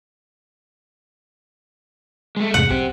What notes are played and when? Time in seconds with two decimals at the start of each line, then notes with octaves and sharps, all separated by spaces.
2.37 G#3 A3
2.54 E2 G#2 C3 F#5
2.70 B1 C4 G4